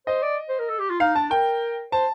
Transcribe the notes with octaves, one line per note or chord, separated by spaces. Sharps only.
C5 D#5
D5
C5
A#4
A4
G4
F4
D#4 F5
D4 A5
A#4 G5
C5 A5